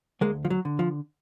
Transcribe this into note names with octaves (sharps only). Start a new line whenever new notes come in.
D2 G#3 A#3
F3
F#3
D3
F3